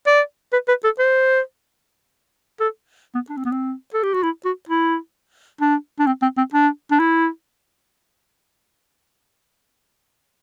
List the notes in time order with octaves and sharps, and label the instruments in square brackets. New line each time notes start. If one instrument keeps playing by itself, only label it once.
[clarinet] D5
B4
B4
A4
C5
A4
B3
D4
C4
B3
C4
A4
G4
F#4
E4
F#4
E4
D4
D4
C4
C4
C4
D4
D4
E4